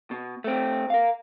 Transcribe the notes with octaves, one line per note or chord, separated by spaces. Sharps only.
B2
A3 C4
A#4 F5